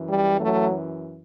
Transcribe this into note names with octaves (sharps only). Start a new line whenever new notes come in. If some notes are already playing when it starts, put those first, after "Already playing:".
Already playing: F#2 E3
G3
F#3 A3